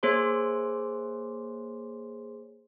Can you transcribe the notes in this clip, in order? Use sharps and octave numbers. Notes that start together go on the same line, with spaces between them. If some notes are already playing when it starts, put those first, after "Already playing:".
A#3 G#4 C5 C#5 C6